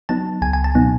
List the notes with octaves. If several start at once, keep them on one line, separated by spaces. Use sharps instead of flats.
F#3 B3 D#4 A5
C#2 G#5
G#5
A5
B2 F#3 B3 D#4